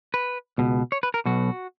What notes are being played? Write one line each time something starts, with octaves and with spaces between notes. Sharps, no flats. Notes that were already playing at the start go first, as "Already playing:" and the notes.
B4
C#2 B2
C#5
B4
A#4
B1 B2 F#4